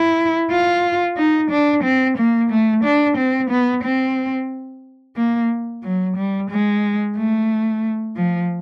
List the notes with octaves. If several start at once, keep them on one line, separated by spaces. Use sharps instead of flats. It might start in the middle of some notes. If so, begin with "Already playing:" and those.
Already playing: E4
F4
D#4
D4
C4
A#3
A3
D4
C4
B3
C4
A#3
F#3
G3
G#3
A3
F3